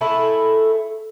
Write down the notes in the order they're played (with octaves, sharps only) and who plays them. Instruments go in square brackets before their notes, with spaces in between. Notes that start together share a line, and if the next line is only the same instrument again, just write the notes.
[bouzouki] G#3 A3 E4 A4